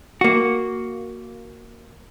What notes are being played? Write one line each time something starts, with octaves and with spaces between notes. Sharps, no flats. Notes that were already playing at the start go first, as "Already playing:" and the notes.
A#3 F#4